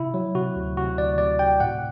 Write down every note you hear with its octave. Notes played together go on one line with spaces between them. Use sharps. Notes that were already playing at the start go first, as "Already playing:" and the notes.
Already playing: C3 E4
F#3
C3 F#4
D2
C3 F#4
D2 D5
C3 D5
C3 G5
A2 F#5